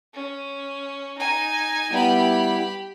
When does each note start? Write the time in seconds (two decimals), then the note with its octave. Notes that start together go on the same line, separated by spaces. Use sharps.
0.14 C#4
1.18 D#4 G#5
1.92 G3 B3 E4 G4 B5